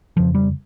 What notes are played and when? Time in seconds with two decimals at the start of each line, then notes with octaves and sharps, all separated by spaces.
0.17 F2 C#3 F3
0.35 G3